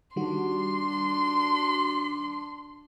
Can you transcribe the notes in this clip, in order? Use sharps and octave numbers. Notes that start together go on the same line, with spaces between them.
D#3 G3 D4 F#4 C6